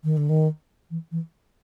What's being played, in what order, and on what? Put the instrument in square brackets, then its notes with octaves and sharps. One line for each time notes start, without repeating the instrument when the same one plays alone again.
[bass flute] D#3
D3
D#3
E3
E3